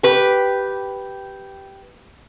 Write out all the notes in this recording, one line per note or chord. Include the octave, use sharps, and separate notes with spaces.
G4 B4